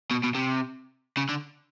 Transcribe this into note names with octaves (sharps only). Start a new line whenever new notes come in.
B2
B2
C3
C#3
D3